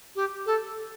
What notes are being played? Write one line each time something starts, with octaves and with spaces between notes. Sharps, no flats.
G4
A4